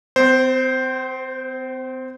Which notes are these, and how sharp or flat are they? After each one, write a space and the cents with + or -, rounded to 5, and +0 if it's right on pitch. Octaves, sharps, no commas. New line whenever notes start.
C4 -40 C5 +0